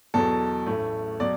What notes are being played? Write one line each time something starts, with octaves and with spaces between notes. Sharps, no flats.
E2 B2 F#3 A4
A1 A2 A3
B2 F#3 D5